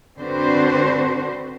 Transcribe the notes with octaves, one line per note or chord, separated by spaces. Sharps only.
D3 C4 D4 F#4 B4 C5